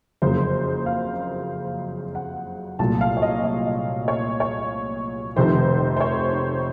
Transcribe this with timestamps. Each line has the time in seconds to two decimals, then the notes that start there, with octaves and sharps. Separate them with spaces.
0.22 F#1 F2 C#3 F#3 A#3 C5
0.86 F5
2.15 F#5
2.79 C2 A#2 F#3 A3 A5
3.01 F5
3.17 C#5
3.22 D#5
3.44 D#5
4.08 C#5
4.40 C#5
5.36 F1 F2 C3 D#3 C5
5.96 C5
6.00 C#5